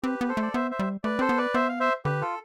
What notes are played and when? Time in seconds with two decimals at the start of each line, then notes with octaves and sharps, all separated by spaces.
0.03 C4 G4 B4
0.21 B3
0.29 A4 C5
0.37 A3
0.42 D5
0.54 B3 C5 E5
0.71 C5 E5
0.79 G3
1.04 A3 B4 D5
1.19 C4 A4 C5
1.29 B3
1.37 B4 D5
1.54 B3 C5 E5
1.69 F5
1.80 C5 E5
2.05 D3 G4 B4
2.21 F4 A4